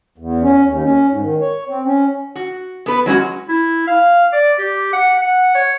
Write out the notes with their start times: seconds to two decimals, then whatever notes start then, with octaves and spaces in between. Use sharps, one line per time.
0.18 E2
0.42 C#4
0.66 D#2
0.83 C#4
1.08 G#2
1.22 D#3
1.41 C#5
1.69 C4
1.85 C#4
2.35 F#4
2.86 B3 B4
3.06 F#3 G#3 C#4 F#4
3.48 E4
3.87 F5
4.33 D5
4.59 G4
4.93 F#5
5.17 F#5
5.55 C#5